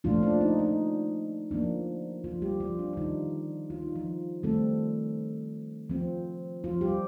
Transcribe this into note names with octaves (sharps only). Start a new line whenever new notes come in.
A#2 F3 A3 D4 F4
D4
D#4
D#4
F3 A#3 D4
F3 F4
G3 G4
F3 F4
D4
F4
D#3 G3 D4 D#4
F4
D#4
F3 F4
D#3 G3 A3 C4 A4
F3 C4
F3 F4
G3 G4